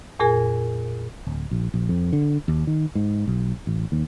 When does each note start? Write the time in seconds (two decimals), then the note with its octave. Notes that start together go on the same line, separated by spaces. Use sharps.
0.19 F2 A#2 G#4 A#4 G#5
1.27 D1
1.51 A#1
1.74 A#1
1.89 F2
2.13 D3
2.48 D#2
2.67 D#3
2.95 G#2
3.27 B1
3.67 A1
3.92 D#2